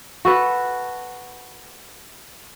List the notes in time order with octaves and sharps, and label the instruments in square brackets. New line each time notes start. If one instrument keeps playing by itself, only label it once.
[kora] F#4 A4 B4